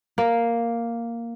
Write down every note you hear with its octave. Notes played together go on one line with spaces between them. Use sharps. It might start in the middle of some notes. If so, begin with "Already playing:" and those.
A#3